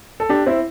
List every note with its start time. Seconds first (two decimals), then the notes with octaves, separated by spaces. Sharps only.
0.20 A4
0.29 D4 G4
0.46 C4 E4